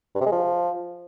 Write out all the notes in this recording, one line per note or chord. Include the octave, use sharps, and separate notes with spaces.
G2
C3
G#3
F3